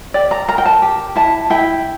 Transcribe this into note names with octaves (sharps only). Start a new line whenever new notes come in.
G4 D5
A#5
A#4 A#5
G5
A5
G4
E4 A5
E4 G5